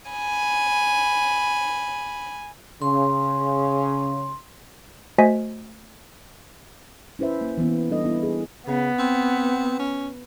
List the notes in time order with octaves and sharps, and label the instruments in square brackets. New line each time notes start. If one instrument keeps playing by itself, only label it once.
[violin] G#5 B5
[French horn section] C#3 [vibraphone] C6
[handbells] A3 F#4 C5 D#5 G#5 B6
[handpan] C#4 E4 B4 C5 E5
A#3
E3 B3
G3 D4 A4 D#5
B3 E4
G#4
[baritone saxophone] C#3 [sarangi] B3
[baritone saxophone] C4
C#4